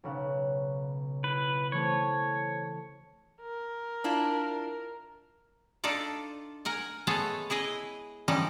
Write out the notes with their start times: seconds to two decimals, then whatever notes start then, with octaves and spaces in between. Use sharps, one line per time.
0.04 B1 C#3 F#5
1.24 E4 B4
1.72 E3 A3 C4 C#5
3.42 A#4
4.04 D4 E4 F4
5.84 D4 D#4 F4 A4 D5
6.65 A#4 F#5 G#5
7.07 G#3 A3 B3 G#4 A4 C#5
7.50 E4 G#4 B4 D#5
8.28 D3 E3 F3 G3 C#4 D#4